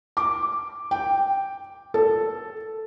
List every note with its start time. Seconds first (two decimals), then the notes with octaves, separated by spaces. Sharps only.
0.17 D6
0.91 G5
1.94 A4